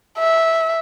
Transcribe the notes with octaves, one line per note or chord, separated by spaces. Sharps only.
E5